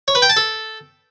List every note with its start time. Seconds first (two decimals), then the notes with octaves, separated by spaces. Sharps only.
0.08 C#5
0.15 B4
0.22 G5
0.29 A5
0.37 A4